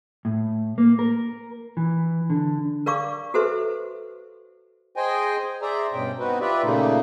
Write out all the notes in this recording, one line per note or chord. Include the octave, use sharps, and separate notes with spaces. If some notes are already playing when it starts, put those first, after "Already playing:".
A2
A#3
A#4
E3
D3
A#4 D5 F5 C#6 D6
F#4 A4 B4 C5 E5
G#4 C5 D#5 G5 G#5
G#4 C5 D5 E5 A#5
G2 B2 C#4 G5
B3 C4 D#4 F#4 B4
F4 G4 B4 D5 E5
A#2 C#3 A3 A#3 D#4